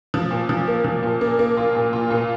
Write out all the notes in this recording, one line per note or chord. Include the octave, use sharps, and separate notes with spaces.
F3
A#2
F3
A#3
F3
A#2
A#3
A#3
F4
A#2
F4
A#2